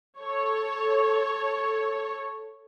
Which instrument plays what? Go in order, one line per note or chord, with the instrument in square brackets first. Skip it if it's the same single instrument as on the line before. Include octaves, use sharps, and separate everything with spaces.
[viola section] A4 C#5